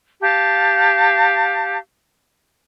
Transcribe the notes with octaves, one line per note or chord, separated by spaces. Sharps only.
G4 F5 A5